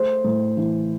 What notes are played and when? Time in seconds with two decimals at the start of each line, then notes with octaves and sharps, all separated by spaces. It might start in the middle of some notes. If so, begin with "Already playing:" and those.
Already playing: A3 C5
0.24 A2
0.57 E3